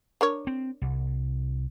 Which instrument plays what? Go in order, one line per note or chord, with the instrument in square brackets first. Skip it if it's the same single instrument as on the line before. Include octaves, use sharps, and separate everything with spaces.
[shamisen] D4 A#4 C#5
[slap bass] C4
C2